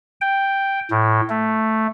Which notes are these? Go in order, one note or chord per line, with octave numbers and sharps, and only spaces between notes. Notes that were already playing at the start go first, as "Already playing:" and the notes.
G5
A2
A3